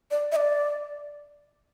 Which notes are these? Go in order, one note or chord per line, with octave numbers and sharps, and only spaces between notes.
D5
E5
D5